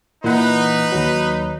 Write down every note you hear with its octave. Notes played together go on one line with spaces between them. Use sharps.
A#2 E3 D#4 B4 F#5
D#2 F#3